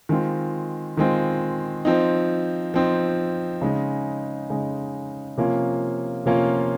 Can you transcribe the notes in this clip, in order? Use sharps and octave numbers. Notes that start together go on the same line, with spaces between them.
D#3 G#3 C4 F4
D#3 G#3 C4 F4
F3 C4 D#4
F3 C4 D#4
C#3 G#3 D#4
C#3 G#3 D#4
C3 F3 A#3 C#4 F4
C3 F3 A#3 C#4 F4